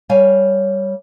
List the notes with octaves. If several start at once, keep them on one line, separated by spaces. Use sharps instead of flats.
G3 C#5 F5 G#5